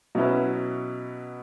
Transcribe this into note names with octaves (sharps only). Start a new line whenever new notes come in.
B2 F#3 C#4 E4 B4